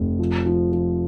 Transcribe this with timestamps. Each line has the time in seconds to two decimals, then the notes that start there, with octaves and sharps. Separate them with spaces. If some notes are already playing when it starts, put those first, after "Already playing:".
Already playing: F1
0.19 F3
0.46 F3
0.72 F3